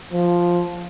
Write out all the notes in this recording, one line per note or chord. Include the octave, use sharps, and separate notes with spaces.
F3